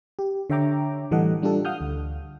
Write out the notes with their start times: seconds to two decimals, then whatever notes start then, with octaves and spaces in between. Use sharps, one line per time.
0.19 G4
0.50 D3 C#5 E5 G5 A#5 D6
1.11 A2 E3 G3 A4 D#5 F#5
1.42 G3 D4 F4 G4 A4
1.65 F5 F#5 D#6 F6 G6
1.81 D2